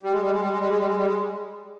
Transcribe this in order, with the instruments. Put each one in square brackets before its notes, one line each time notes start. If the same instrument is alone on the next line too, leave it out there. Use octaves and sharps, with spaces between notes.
[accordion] G3
G#3
G3
G#3
G3
G#3
G3
G#3
G3
G#3
G3
G#3